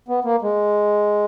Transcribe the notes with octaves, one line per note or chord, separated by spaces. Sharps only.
B3
A#3
G#3